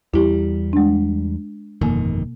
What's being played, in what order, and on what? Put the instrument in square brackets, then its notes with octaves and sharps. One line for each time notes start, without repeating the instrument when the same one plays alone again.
[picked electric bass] E2 G3 [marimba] E4 G4
[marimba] G#3 D4
[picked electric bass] G1 F2 D#3 [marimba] B2 A#3